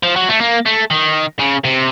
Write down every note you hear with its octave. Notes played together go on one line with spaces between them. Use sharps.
F3
F#3
A3
A#3
A3
D#3
C#3
C3